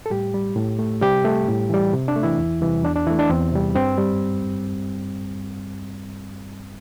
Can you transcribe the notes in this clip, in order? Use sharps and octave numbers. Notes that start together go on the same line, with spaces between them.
A4
A2 G3 G4
G3
A2
A3
C3 G3 G4
A3
A2
E3 G3
C3
D4
A3
E3 E4
E2
C3 E3 G3
E2 D4
D4
E3 A3 E4
D4
E2 C4
C3 G3
G2 C4
G3